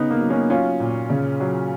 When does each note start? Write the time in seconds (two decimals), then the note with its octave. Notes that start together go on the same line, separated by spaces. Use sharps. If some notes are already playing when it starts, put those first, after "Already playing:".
Already playing: C#3 B3 D#4
0.10 A#3
0.20 F#3
0.30 A#3 C#4
0.50 F#3 C#4 F4
0.80 A#2
1.10 C#3
1.40 F#3